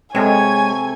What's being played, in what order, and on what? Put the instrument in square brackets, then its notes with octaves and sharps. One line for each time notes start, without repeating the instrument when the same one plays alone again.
[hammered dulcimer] C3 A4 [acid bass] G#3 [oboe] C#5 [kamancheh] G#5